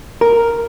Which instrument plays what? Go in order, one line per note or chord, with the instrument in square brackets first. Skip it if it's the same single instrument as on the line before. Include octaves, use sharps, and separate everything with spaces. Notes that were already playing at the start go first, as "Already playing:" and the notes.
[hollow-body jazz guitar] A#4